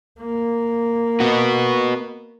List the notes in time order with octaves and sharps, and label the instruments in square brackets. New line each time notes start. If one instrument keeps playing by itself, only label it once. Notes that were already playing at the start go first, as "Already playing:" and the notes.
[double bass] A#3
[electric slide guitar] B3 F#4